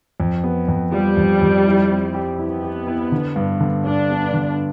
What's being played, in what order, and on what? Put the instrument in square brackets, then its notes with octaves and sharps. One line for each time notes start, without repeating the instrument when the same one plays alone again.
[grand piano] F2
B3
F2
[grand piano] F3 [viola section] G3
[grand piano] F2
F2
E4
C4
G4
[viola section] B3 [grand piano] E4
[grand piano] G4
E4
D3
G2
D3
[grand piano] G2 [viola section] D4
[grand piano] B3
D3